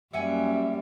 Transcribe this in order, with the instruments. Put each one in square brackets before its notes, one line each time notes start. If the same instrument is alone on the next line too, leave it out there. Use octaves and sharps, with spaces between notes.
[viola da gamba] F#2 G3 A#3 [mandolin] E5 F#5 G#5